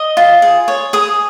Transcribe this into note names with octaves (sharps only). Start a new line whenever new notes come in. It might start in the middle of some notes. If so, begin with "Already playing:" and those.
Already playing: D#5
F4
G#4
C#5
G#4 D#6